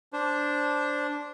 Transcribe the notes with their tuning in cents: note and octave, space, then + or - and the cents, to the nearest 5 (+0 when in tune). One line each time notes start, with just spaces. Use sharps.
D4 -5 C5 +0